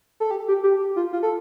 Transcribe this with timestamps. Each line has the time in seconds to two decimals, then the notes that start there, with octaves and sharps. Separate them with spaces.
0.20 A4
0.31 G4
0.48 G4
0.63 G4
0.96 F4
1.13 F4
1.23 A4